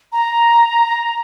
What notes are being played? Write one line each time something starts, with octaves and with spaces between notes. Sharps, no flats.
A#5